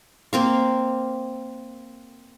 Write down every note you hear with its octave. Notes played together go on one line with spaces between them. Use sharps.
A#3 C4 F5